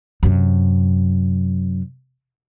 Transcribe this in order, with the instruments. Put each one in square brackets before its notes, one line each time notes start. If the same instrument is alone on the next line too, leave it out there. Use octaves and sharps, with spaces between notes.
[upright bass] F#2 C3